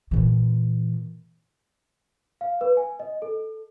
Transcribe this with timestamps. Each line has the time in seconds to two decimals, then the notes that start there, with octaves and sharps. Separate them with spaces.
0.11 A#2 E3
2.41 F5
2.61 B4
2.77 G#5
3.00 D#5
3.22 A4